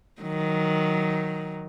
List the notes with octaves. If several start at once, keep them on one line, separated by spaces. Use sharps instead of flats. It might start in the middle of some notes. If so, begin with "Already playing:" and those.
D#3 F#3